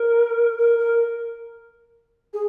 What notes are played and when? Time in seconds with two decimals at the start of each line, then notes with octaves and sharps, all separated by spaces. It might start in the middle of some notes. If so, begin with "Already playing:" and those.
Already playing: A#4
0.58 A#4
0.79 A#4
2.33 G#4